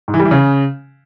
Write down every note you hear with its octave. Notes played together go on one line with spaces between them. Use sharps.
G#2
E3
G3
E3
C#3